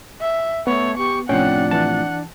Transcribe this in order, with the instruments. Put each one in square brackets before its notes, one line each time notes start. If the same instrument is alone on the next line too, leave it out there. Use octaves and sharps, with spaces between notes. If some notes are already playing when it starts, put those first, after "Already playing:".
[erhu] E5
[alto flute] A3 [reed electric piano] B3 [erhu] C#5
[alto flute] G4 [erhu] C#6
[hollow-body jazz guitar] A2 C3 F3 [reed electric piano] C#4 G5 [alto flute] D4 [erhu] F#5
[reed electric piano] E3 A5 [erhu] F#5